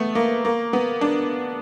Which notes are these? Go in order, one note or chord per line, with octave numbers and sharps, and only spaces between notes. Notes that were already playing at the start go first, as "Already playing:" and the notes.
Already playing: A3 B3
A#3
A#3
B3
D4